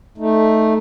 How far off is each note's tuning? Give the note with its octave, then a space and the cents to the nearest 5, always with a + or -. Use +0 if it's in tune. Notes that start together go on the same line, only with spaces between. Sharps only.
A3 -5 D#4 -5